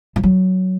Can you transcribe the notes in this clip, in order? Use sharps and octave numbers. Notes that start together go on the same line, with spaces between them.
F3
F#3